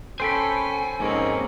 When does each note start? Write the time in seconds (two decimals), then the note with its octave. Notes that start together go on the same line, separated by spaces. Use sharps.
0.20 C#4 A4 C5 G5 G#5 B5
1.00 F2 G#2 A#3 C4 C#4